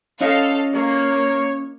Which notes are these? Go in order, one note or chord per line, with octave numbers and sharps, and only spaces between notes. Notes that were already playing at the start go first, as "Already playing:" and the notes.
C#4 F4 A4 D#5 F5
A#3 C#5